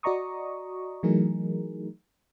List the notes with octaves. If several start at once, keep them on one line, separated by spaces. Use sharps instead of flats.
F#4 D5 D#5 A#5 C#6 D#6
E3 F#3 A3 D#4 G#4 A#4